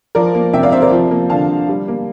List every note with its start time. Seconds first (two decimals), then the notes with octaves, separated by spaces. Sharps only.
0.15 F3 A#4 D5
0.35 A#3
0.53 C3 E5 G5
0.63 D5 F5
0.72 C3 C5 E5
0.82 A#4 D5
0.91 F3
1.11 A#3
1.30 D3 F5 A5
1.49 D3
1.69 G3
1.88 A#3